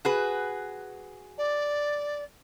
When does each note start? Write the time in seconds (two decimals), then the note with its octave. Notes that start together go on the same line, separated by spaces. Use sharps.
0.05 F#4 G#4 B4
1.37 D5